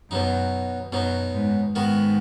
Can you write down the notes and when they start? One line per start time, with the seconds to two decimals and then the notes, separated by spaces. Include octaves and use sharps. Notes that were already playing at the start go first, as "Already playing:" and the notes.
0.11 F#2 B2 F#3 D#4
0.92 F#2 B2 F#3 D#4
1.34 G#2
1.75 G#2 D#3 B3 F#4